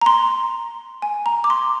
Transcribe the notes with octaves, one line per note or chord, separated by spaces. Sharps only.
A#5
C6
G#5
A#5
D6
C6